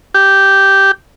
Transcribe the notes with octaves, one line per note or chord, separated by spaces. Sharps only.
G4